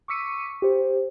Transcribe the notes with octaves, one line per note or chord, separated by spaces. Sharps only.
C#6 D6 E6 B6 C#7 D#7
G4 C5